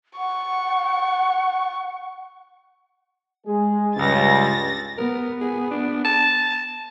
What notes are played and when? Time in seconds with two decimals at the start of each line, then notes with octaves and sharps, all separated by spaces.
0.18 F#5 C#6
3.46 G#3 G#4
3.97 C#2 G2 C#3 G3 A6 A#6
4.98 B3 A#4
5.41 G#4
5.71 D4
6.05 A5